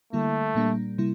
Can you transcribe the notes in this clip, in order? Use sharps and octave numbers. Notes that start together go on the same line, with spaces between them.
D3 G3 A3 A#3 E4
A#2 G3 A#3 D4
C3 G3 A#3 E4